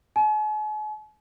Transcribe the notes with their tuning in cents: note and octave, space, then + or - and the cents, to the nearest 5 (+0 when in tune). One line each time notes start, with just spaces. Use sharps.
G#5 +45